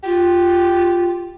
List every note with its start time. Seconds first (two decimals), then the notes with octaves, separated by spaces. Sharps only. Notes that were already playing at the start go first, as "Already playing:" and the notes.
0.04 F4 G4